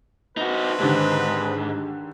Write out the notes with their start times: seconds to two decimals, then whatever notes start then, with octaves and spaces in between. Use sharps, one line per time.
0.37 C4 D4 D#4 F#4 B4
0.80 G#2 D3 D#3 G4